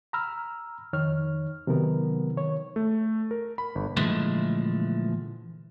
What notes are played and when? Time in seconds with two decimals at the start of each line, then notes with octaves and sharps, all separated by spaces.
0.13 A#5 B5 E6 F6
0.93 F2 D#3 C#5 F6
1.67 C3 D#3 F#3 B3 A#4 B4
2.36 D#3 C#5
2.76 A3
3.31 A#4
3.58 B5
3.75 G1
3.97 A#2 D3 E3 F3 G#3 A3